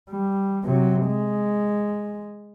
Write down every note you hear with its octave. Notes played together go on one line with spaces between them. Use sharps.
G3
C3 F#3
G#3